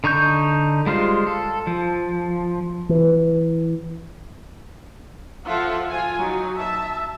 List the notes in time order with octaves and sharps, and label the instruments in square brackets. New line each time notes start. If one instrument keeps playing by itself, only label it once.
[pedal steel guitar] D3 D#4 C#6 G6
G3 G#3 F4 C5
A4
F3
[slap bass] E3
[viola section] F3 F4 A4 E5 F#5
F4 G#5
F#3 D#4
E5 A5